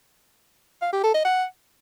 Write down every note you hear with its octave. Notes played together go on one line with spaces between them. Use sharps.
F5
G4
A4
D#5
F#5